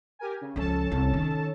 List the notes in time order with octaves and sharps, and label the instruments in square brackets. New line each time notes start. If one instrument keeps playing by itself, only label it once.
[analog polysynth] G4 A#4 G#5
C#3
[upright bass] C#2 F3 [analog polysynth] C#4 A4 A5
[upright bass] C2
D#3